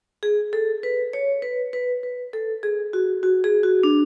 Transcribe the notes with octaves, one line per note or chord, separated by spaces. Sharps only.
G#4
A4
B4
C#5
B4
B4
B4
A4
G#4
F#4
F#4
G#4
F#4
D4